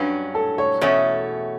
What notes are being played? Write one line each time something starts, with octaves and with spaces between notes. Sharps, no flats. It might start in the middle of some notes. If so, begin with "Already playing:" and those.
Already playing: G2 F#3 C#4 B4
A4
C#5
E2 B2 A3 C#4 C#5